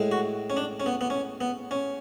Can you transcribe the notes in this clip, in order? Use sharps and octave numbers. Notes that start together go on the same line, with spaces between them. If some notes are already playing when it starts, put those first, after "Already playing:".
Already playing: A2 G#3
F#4
C#4
D4
C#4
B3
B3
C#4
B3
C#4